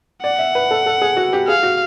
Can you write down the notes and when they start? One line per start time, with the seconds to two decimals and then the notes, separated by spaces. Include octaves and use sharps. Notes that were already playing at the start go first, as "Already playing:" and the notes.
0.23 D5 F#5
0.39 E5
0.55 B4
0.71 A4
0.86 A4
1.02 G#4
1.17 F#4
1.33 G4
1.48 G#4 F5
1.63 F#4